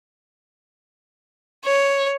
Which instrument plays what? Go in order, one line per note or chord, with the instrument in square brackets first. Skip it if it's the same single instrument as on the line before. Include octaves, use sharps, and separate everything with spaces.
[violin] C#5